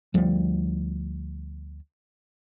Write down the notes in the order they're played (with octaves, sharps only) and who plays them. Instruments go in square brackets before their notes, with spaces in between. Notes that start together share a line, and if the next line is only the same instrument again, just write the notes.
[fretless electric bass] D2 F3 G3